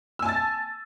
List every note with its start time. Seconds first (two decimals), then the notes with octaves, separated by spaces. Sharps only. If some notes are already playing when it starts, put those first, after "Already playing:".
0.19 E6
0.22 G#5
0.26 A5
0.29 A6